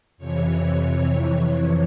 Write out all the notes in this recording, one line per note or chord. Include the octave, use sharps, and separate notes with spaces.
F2 C3 E3 C#5